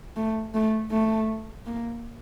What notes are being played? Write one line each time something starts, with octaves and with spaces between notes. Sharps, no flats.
A3
A3
A3
A#3